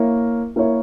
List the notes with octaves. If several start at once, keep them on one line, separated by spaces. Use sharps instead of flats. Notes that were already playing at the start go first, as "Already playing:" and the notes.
Already playing: A#3 E4 A#4 C#5
A#3 E4 A#4 C#5